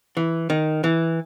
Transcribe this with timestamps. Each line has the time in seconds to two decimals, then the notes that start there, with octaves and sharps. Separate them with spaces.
0.17 E3
0.50 D#3
0.84 E3